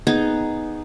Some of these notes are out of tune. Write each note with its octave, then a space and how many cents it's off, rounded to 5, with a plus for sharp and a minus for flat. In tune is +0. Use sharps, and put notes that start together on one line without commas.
B3 +0 D#4 +0 G#4 +0